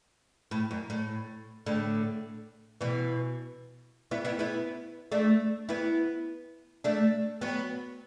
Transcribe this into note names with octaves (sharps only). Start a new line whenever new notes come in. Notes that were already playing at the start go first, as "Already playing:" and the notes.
A2
F#2
A2
A2 D3
B2 E3
B3 E4
B3 E4
B3 E4
A3 D4
B3 E4
A3 D4
F#3 B3